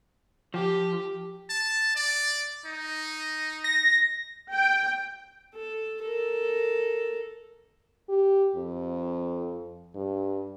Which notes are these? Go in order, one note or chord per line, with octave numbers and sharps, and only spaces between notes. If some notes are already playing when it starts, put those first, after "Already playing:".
F3 G4
A5
D5
D#4
A#6
G5
A4
A4 A#4
G4
F2
G2